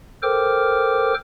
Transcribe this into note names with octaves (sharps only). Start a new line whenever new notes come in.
A4 A#4 C5 G5 D6 F6